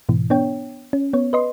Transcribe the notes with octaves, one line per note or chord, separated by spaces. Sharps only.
G#2 B2 E3
B3 D4 C#5 G5
C#4
B3 C#5
B4 D#5 C6